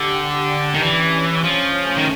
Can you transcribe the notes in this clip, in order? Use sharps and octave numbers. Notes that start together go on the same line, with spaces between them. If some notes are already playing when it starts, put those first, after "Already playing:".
Already playing: D3 G4
D4
D#3
E3 C#4
F3 C#4
A3
D#3